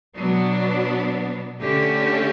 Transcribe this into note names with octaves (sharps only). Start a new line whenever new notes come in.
B2 F#3 B3 D4
D3 A3 C#4 G4